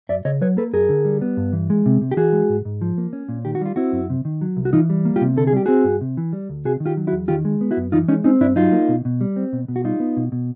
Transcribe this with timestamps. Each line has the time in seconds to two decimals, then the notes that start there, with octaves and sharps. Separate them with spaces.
0.09 F#2 D5 E5
0.25 C#3 C#5 D#5
0.41 F#3 B4 C#5
0.57 A#3 A4 B4
0.73 F#2 G#4 A#4
0.89 D3
1.05 G3
1.22 B3
1.37 G2
1.53 E3
1.70 G#3
1.86 C3
2.01 C3
2.11 G4
2.17 E3 F#4 G#4
2.33 G#3
2.49 G#2
2.65 G#2
2.81 F3
2.98 A#3
3.13 C#4
3.29 A#2
3.45 D#3 G4
3.55 F#4
3.61 G3 F4
3.76 C4 E4 F#4
3.93 F#2
4.10 C3
4.25 D#3
4.41 F#3
4.57 C2
4.65 F#4
4.73 E3 D#4 F4
4.90 G3
5.05 A#3
5.16 F4 G4
5.21 C3
5.36 D3 A4
5.47 G#4
5.53 G3 G4
5.66 C4 F#4 G#4
5.84 G2
6.01 C3
6.17 E3
6.33 G3
6.49 D2
6.65 C3 F#4 G#4
6.80 D#3
6.86 F4 G4
6.97 F#3
7.07 E4 F#4
7.12 E2
7.28 D#3 F4 G4
7.45 G#3
7.61 B3
7.71 E4 F#4
7.77 F#2
7.92 E3 D#4 F4
8.08 G#3 C#4 D#4
8.24 C4 C#4 D#4
8.41 G2 D4 E4
8.56 F#3 D#4 F4
8.72 A#3
8.89 B2
9.05 B2
9.21 G3
9.36 C4
9.53 B2
9.68 B2
9.76 F#4
9.84 G3 D#4 F4
10.00 B3
10.17 B2
10.32 B2